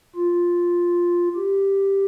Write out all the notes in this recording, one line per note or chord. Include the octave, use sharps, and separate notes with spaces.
F4
G4